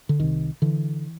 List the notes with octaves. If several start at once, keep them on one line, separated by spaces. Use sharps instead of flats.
D3
C2 C3 D#3
D3 E3